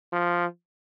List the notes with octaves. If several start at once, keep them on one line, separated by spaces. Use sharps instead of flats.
F3